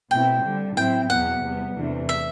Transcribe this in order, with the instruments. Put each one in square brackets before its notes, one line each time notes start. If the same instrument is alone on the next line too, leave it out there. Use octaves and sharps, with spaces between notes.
[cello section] B2 A3 C4 E4 [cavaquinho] G5
[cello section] D3 G3 D4
[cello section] A2 F#3 C4 E4 [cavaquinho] G5
[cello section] E2 B2 F#3 B3 [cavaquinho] F#5
[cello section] E2 C3 G3 B3
E2 C3 E3 A3 D4
[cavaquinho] E5